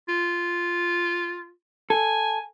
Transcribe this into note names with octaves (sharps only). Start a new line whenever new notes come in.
F4
A4 G#5